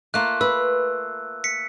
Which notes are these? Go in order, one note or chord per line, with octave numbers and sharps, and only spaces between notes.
A3 A#3 F4 F#6
B4 E6
B6 C#7